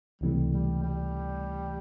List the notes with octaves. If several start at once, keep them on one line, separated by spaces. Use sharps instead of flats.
C#2 C3 E3 G3 A3
G3
G3